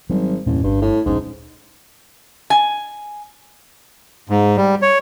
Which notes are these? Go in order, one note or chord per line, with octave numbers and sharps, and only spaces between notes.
G#1 F#3 G3
A1 E2 G2 A#2
G1 G2
A2
D1 A#1 G#2 C#4
G#5
G#2
G3
C#5